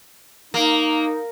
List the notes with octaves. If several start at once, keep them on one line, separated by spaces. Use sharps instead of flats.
A#3 D#4